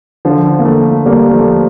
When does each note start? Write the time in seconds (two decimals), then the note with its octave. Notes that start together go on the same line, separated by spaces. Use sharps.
0.25 D3 F3
0.59 A#3
0.65 F3 A3
1.06 G3 A#3
1.34 F3 A3